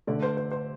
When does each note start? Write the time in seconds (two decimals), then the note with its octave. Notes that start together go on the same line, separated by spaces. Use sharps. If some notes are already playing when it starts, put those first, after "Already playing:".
0.07 D3 A3 D5
0.22 C5
0.37 C5
0.51 C5